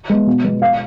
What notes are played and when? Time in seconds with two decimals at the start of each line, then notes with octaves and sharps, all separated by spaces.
0.09 G#3 B3
0.27 B2
0.44 G#3 B3
0.62 F5